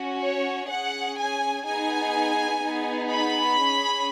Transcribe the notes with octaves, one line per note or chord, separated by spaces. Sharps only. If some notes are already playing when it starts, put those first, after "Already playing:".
Already playing: C#4 F#4
C#5
C#4 G#4 F#5
G#5
B3 D#4 G#4 G#5
B3 D#4 G#4
B5
C#4 G#4